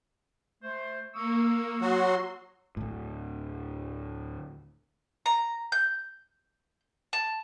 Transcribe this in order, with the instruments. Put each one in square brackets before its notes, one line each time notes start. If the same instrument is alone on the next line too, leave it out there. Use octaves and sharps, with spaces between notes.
[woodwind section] A3 C5
[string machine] A#3 [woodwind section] C#6 D#6 E6
[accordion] F#3 F#4 [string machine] C6
[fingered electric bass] D2 A2
[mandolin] A#5
G6
A5